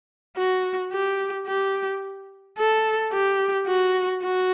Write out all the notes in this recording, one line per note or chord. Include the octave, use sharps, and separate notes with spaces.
F#4
G4
G4
A4
G4
F#4
F#4